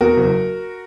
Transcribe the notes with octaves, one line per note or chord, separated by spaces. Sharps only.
E2 F#4 A#4
F#1